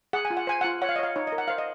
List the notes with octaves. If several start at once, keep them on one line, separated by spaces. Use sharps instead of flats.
G#4 F#5
G#5
F4
F#5
C5 G#5
F#5
F4
C#5 F#5
F5
D#5
C#5 F5
D#4 C#5
D#5
A#4
F#5
C5 F5
D#5